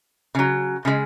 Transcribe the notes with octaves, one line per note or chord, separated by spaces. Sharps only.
C#3 F#3
C#3 G#3